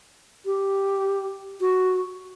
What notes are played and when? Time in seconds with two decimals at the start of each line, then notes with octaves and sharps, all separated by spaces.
0.46 G4
1.61 F#4